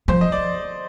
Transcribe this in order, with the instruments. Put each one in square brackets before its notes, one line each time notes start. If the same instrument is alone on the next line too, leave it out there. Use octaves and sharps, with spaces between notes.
[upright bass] F3 [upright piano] C5
[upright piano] D#5
D5